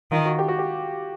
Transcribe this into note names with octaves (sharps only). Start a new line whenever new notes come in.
D#3 F4
F#4
G4
F#4
G4